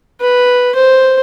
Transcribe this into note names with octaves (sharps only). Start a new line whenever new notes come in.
B4
C5